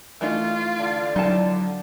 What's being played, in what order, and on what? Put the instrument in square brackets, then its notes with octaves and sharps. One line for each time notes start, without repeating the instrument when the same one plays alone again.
[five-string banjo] E3 A3 D#4 [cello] F4
[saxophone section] D3
[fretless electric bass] F#3 [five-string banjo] D#4 E4 A5